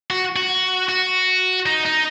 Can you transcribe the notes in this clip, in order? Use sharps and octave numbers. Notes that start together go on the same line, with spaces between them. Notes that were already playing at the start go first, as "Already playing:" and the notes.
F#4
F#4
F#4
D#4
D#4